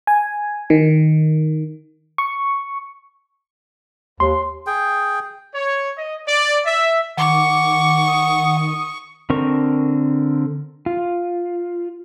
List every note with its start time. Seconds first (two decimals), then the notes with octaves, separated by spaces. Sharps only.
0.07 G#5
0.70 D#3
2.18 C#6
4.20 D#2 C6
4.67 G#4 G5
5.55 C#5
5.97 D#5
6.27 D5
6.65 E5
7.17 D#3 F#5 C#6 D6
8.08 D#6
9.30 D3 C4 A#4 C#6
10.86 F4